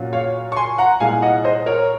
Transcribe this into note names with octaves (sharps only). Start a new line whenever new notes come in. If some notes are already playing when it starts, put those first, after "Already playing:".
Already playing: A#2 F#3 C#4 F4
C#5 F5
C#6
G#5 C6
F#5 A#5
C2 A#2 G#3 F5 G#5
D#5 F#5
C5 D#5
A#4 C#5